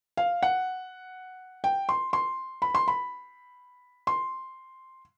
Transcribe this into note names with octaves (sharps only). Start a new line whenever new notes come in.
F5
F#5
G5
C6
C6
B5
C6
B5
C6